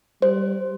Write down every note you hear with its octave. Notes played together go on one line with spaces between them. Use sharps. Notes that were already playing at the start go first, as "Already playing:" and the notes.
G3 C5